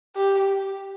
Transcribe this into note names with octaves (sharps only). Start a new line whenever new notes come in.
G4